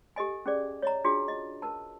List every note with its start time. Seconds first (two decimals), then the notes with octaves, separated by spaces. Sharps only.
0.16 G4 A4 D#5 G#5
0.46 C#4 G#4 D5
0.82 C#5 D#5 A#5
1.04 D4 F4 F#4 G#4
1.28 D#5
1.62 A#4 B4 A5